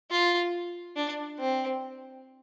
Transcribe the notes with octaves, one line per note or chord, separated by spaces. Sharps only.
F4
D4
C4